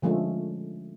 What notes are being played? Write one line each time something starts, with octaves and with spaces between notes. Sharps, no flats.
D3 F3 G#3 A3 C#4